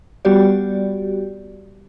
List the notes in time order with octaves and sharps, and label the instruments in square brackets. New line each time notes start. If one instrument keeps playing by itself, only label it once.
[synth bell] G3 B3 F#4 G4 D5